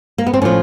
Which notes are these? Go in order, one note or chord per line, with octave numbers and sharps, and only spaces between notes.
A#3
B3
C4
A2 F3 C#4